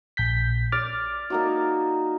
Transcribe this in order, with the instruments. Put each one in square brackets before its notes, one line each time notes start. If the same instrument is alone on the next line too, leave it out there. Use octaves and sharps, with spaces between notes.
[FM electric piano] A#1 G6 B6
[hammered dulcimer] D5 [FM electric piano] D6 F6 A6
[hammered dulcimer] A#3 D#4 F#4